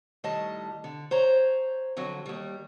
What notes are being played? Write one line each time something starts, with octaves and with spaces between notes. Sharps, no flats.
A2 D#3 G3 D#5 A5
D3
C5 C#5 A#5
F2 D3 F#3
D#2 G3